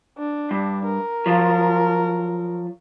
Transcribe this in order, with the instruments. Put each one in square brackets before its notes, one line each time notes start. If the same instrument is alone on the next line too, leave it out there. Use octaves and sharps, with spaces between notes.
[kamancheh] D4
[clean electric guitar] G2
[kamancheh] A#4
[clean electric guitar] F3 F#3